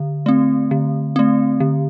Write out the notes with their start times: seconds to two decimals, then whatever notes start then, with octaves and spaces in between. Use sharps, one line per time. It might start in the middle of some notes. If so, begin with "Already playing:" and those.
Already playing: D3
0.26 A3 C4
0.71 D3
1.16 A3 C4
1.60 D3